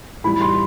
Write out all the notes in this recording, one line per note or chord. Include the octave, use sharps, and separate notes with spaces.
A2 E3 G3 B5
C6